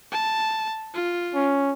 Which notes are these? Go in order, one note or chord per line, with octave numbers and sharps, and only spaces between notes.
A5
F4
C#4